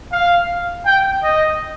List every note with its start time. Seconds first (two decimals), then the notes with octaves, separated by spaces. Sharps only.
0.12 F5
0.85 G5
1.23 D#5